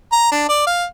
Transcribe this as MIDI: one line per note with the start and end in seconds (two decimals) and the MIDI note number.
0.12 0.30 82
0.31 0.47 62
0.49 0.63 74
0.66 0.84 77